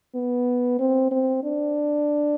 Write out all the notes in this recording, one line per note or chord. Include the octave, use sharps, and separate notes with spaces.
B3
C4
C4
D4